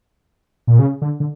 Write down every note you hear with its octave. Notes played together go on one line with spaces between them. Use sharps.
A#2
C#3
D3
D3